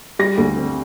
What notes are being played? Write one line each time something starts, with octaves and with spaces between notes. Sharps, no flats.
G3 A#6
D2
C4